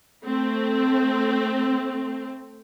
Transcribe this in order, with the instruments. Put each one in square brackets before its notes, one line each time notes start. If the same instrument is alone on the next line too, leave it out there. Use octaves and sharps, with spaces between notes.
[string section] A3 C4